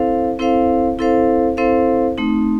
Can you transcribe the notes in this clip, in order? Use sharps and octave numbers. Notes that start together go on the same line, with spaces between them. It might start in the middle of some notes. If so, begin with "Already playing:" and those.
Already playing: C4 E4 A4 C5 F5
C4 E4 A4 C5 F5
C4 E4 A4 C5 F5
C4 E4 A4 C5 F5
A3 C4 D#4